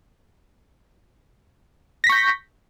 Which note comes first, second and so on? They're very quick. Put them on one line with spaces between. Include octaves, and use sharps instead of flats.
A#6 B6 C#6 G6